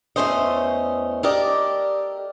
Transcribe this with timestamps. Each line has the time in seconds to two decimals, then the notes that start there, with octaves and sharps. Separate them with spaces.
0.16 E2 B2 A3 C#4 C5 D#5
1.23 G4 A4 A#4 D5 D#5